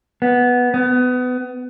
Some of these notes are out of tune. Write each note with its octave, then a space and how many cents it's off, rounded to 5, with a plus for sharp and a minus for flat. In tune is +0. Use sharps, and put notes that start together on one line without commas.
B3 -5
B3 +25